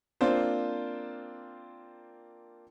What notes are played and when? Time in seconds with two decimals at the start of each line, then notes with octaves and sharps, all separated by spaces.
0.21 A#3 C4 D4 F4 C5